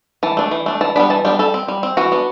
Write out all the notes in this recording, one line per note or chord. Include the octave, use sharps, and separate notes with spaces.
E3 A5
A3 D4
E3
A3 D4
E3 A5
G3 B3 D4 B5
E3 A5
G3 B3 D4 G5
G3 A4
C4
G3
C4
E3 F#4
B3 D4